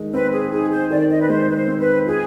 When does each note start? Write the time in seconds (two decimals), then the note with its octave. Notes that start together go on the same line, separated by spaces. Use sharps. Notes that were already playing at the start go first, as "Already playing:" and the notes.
Already playing: D#3 G#3 D#4
0.13 C4 B4
0.33 G#4
0.52 D#4 G#4
0.71 C5
0.90 D#3 D5
1.10 D#5
1.20 B4
1.29 G#3 C5
1.50 B4
1.55 C5
1.67 C4
1.80 B4
2.06 F4 G#4